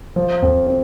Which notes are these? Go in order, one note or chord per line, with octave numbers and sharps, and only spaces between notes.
F3
F2
C4